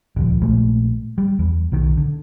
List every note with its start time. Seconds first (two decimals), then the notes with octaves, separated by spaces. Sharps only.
0.16 D#1 C#2 F3
0.41 A#1 A#2 G#3 A3
1.18 G3
1.39 E2
1.72 B1 D#3
1.97 D3